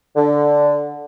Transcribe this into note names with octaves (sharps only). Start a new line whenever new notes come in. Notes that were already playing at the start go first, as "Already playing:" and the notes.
D3